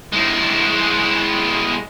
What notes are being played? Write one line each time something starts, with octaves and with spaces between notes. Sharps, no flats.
G#3 E4